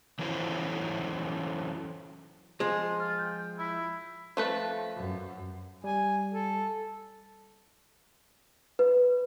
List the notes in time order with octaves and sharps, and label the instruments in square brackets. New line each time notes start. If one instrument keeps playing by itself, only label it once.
[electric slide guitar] E3 F#3 C#4 E4 A4 C5
[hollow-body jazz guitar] F3 G#3 [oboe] C6
[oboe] F4
G5
E4
[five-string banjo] F3 A3 B4
[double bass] F#2
[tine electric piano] G3 [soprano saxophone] G#5
[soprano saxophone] A4
[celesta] B4